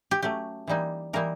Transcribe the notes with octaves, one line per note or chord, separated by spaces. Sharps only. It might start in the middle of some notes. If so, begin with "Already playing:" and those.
G4
F#3 A3 C#4 G4
E3 G3 A#3 D#4
E3 G3 A#3 D#4 A#4